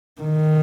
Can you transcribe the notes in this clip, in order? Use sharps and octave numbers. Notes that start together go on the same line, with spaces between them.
D#3